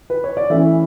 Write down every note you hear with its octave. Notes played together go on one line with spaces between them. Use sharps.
B4
C#5
D5
E3 A3 C#4 E4 E5